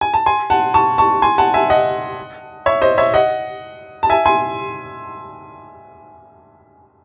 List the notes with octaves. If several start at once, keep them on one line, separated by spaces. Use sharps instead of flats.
G#5
A5
G#5 C6
F#5 A5
A5 C#6
A5 C#6
G#5 C6
F#5 A5
E5 G#5
D#5 F#5
C#5 E5
C5 D#5
C#5 E5
D#5 F#5
A5
E5 G#5
G#5 C6